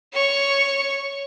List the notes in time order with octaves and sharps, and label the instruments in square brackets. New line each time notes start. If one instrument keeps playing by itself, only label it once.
[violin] C#5 C#6